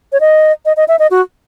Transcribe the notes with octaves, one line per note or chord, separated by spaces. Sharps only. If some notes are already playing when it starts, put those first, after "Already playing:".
C#5
D#5
D#5
D#5
E5
D#5
F#4